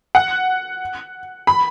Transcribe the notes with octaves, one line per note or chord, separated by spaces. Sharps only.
F#5
B5